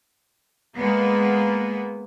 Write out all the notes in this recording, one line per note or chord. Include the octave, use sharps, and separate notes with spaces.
G#3 A#3 B3